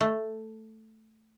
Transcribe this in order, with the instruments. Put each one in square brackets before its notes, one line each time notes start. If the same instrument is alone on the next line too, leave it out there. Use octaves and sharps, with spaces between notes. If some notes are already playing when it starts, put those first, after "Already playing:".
[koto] A3